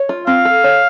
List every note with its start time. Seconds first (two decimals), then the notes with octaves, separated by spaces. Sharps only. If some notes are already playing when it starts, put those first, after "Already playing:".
Already playing: C#5
0.09 F4
0.27 C4 F5
0.45 A4
0.64 C#5